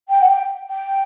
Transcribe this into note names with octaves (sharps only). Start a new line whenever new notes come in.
G5
F#5
G5
G5